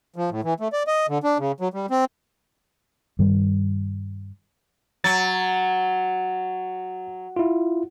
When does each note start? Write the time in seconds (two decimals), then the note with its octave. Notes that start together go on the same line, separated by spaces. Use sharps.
0.16 F3
0.31 A2
0.43 E3
0.60 A3
0.73 D5
0.87 D#5
1.09 D3
1.24 D4
1.38 C#3
1.60 F#3
1.74 G3
1.90 C4
3.19 G2 D#3 G3
5.04 F#3 A6
7.36 E4 F4